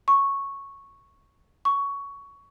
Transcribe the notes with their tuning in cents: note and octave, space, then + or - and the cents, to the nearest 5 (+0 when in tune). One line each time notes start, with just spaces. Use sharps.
C#6 -5
C#6 +15